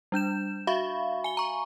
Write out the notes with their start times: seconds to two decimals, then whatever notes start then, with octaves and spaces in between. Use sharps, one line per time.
0.12 G3 D4 G6 E7
0.67 F#4 E5 F5 B5 C#6
1.24 G#5 G7
1.37 A#5 C#6